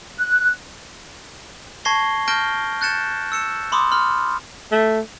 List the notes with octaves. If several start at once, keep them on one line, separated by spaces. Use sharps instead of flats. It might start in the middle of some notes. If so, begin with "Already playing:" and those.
F#6
A5 C#6 G#6 A#6 C7 G7
A5 F6 G6 A#6 D7 G7
F#6 G6 A6 C#7 E7
E6 C#7 E7
B5 C6 D6 D#6
B5 C6 F6
A3